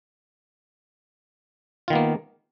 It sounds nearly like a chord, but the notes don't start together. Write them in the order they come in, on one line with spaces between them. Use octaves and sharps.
F4 D#3 B3 A#3